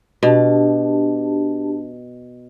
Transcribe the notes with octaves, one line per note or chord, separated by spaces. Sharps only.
B2 D4 G4 A5